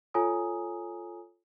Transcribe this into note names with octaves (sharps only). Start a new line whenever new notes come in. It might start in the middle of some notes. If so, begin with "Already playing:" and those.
F4 A4 C#5 G#5 A#5 D#6